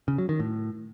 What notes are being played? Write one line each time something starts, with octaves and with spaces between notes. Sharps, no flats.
C#3
F#3
D#3
A2